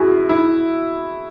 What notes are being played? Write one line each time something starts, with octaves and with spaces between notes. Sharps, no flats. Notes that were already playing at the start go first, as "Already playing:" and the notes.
Already playing: F#2 E4 F#4 G#4
E4